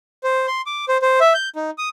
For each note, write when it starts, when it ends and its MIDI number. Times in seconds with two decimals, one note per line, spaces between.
0.24 0.47 72
0.47 0.62 84
0.66 0.85 86
0.88 0.98 72
1.02 1.19 72
1.21 1.33 76
1.34 1.49 91
1.56 1.70 63
1.78 1.89 87